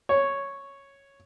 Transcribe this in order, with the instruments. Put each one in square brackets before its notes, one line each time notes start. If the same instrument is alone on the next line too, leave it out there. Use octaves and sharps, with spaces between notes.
[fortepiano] C#5